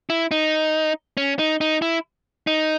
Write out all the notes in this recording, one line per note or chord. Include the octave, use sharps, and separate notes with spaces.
E4
D#4
C#4
D#4
D#4
E4
D#4